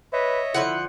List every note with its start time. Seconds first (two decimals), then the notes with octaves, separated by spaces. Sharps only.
0.13 B4 C#5 D#5 E5
0.54 D3 F3 E4 F#5